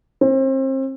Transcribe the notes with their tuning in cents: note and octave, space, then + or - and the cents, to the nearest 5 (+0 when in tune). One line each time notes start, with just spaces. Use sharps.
C4 +35